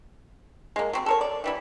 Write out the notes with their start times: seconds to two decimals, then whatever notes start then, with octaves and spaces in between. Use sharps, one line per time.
0.76 G#3 A#3
0.93 F#3 C4
1.06 A4 A#4 C#5
1.21 D5
1.44 E3 G3 E4